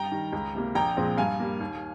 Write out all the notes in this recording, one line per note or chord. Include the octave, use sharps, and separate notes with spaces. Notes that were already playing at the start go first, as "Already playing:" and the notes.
Already playing: G2 G5 A#5
D#3 G3
C#2
C3 G3 A#3
A#1 G5 A#5
A#2 F3 G#3 C4
G2 F5 G#5
G3 A#3
D#2